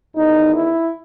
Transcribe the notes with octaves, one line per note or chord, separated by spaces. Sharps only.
E2 D#3 D#4
E4